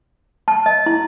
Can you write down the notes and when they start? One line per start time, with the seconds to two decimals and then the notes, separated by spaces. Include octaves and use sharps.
0.48 A5
0.66 D#5
0.86 E4